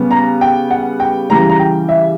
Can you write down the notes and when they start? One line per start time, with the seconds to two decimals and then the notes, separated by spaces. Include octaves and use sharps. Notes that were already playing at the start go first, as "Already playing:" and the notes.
Already playing: C#3 G3 B3
0.11 A#5
0.41 G5
0.71 F#5
1.00 G5
1.29 C#3 E3 G3 A#5
1.50 A#5
1.59 G5
1.89 E5